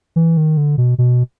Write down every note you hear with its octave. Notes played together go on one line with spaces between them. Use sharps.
E3
D#3
D3
B2
B2